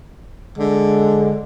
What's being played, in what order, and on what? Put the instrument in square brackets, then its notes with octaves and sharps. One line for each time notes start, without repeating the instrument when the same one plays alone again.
[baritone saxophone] D3 [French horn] G#3